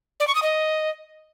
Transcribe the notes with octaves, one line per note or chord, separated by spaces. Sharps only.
D5
C#6
D#6
D#5